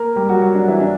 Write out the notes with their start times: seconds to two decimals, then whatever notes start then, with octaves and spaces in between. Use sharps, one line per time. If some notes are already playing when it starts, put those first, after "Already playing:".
Already playing: A#3 A#4
0.16 G3 G4
0.29 F#3 F#4
0.42 F#3 F#4
0.55 D4
0.68 E3 E4
0.80 D4